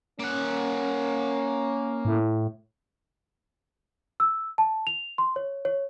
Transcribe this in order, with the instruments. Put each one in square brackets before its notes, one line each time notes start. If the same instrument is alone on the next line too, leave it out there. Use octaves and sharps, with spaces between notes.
[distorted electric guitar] A#3 F#5 [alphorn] C#4
[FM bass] A2
[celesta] E6
A5
F7
C6
C#5
C#5